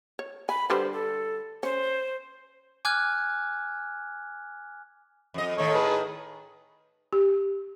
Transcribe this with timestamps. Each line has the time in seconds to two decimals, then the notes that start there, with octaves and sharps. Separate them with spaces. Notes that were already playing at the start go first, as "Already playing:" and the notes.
0.19 C#5
0.49 G#5 B5
0.70 D3 G3 B4 C5
0.93 A4
1.63 C#4 C5
2.85 G#5 D6 F6 F#6 G#6
5.34 F2 D#5
5.58 A2 D#3 A4 C#5
5.74 G#4 B4 A5
7.13 G4